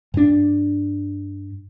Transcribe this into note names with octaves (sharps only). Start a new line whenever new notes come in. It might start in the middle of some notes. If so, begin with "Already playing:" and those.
G2 D4